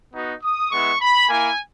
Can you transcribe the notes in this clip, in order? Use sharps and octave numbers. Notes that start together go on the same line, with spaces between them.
B3 D#4 F#4
D#6
G#3 B3 E4 C#6
B5
A#3 E4 G#5